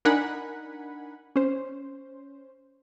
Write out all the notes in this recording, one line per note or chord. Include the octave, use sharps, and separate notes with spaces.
D4 D#4 A#4 F#5 G#5 B5
C#4 C5